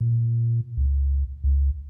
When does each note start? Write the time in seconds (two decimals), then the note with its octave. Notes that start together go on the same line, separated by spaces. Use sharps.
0.01 A#2
0.77 C#2
1.44 C#2